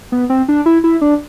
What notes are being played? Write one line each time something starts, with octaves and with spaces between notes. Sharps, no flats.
B3
C4
D4
E4
E4
D4